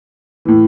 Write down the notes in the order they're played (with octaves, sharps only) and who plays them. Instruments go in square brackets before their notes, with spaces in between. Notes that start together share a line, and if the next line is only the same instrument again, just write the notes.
[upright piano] A2 E3